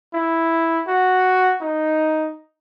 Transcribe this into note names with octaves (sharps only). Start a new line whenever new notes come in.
E4
F#4
D#4